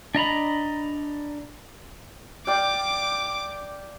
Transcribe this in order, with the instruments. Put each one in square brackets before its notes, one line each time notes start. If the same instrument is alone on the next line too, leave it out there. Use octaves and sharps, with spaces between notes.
[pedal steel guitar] D4 D#5 A#5 B5
[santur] D5 F5 G5 [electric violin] D6